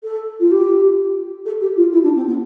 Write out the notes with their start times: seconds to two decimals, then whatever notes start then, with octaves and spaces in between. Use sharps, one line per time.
0.03 A4
0.40 F4
0.51 G4
1.45 A4
1.60 G4
1.76 F4
1.92 E4
2.03 D4
2.15 C4
2.27 B3